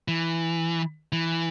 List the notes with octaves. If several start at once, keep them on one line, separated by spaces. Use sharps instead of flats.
E3
E3